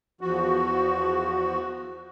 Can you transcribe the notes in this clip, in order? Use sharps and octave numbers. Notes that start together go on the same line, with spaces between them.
E2 F3 F#4